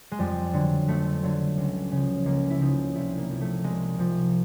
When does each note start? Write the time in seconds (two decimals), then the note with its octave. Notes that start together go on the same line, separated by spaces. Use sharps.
0.12 G#3
0.19 F2 G3
0.53 D3 F#3
0.88 F2 A3
1.23 D3 F#3
1.57 C#2
1.92 C#3 F3
2.26 C#2 A#3
2.50 E4
2.61 C#3 F3 D#4
2.95 C2 E4
3.18 A#3
3.30 C3 F3
3.41 A3
3.64 C2 G#3
3.98 C3 F3